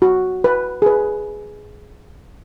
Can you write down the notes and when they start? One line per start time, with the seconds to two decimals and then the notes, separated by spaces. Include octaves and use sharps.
0.02 F#4
0.44 B4
0.82 G#4
0.86 B4